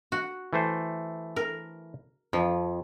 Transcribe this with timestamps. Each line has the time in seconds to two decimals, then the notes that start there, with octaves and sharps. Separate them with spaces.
0.12 F#4
0.53 E3 A3 C5
1.36 A#4
2.33 F2 F3